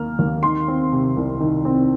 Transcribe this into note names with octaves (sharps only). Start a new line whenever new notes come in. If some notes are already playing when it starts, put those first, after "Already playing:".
Already playing: D#2 D#3 A#3 F6
D#2
D#3 C6
C4
C3
C2
D#3
C4